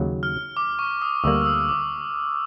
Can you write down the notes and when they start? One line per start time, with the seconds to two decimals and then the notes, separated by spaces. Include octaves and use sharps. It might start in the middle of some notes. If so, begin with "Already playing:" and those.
Already playing: D#2 C#3 F#3
0.23 F6
0.57 D6
0.79 C#6
1.02 D#6
1.24 D2 D3 G3 A#3 E6
1.42 E6
1.46 D#6
1.69 D6